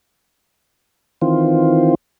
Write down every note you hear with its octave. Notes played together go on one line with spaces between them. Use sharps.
D#3 E3 C4 F4